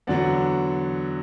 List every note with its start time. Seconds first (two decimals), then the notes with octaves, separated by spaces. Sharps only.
0.07 E2 D3 F#3 D5 F#5